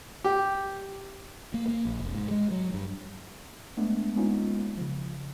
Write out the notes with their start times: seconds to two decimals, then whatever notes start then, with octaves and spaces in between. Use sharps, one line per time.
0.24 G4
1.54 A#3
1.68 A#3
1.85 A#1
2.00 F1
2.14 G#2
2.31 G#3
2.51 F#3
2.74 G2
3.77 G#3 A3 B3 D4
4.16 G#3 A#3 B3 C#4 D#4 F4
4.77 C#3 F3